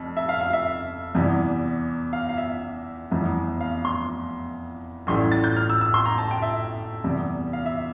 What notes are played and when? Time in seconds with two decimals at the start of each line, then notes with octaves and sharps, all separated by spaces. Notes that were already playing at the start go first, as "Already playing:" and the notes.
Already playing: F1 F2
0.17 E5
0.29 F5
0.41 F5
0.53 E5
1.15 E2 C3 E3 G3
2.13 F5
2.29 F5
2.38 E5
3.11 F1 E2 E3
3.61 F5
3.85 C6
5.07 A1 A2 E3 G3 C6
5.32 A6
5.44 G6
5.56 F6
5.70 E6
5.81 E6
5.94 C6
6.06 A#5
6.18 A5
6.31 G5
6.42 E5
7.04 E2 C3 G3
7.53 F5
7.66 E5